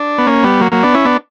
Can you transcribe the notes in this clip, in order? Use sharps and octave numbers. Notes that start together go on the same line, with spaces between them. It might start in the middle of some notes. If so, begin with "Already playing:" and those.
Already playing: D4
B3
A#3 C#4
G3 B3
F#3 A#3
F#3 A#3
B3 D4
C#4 E4
B3 D4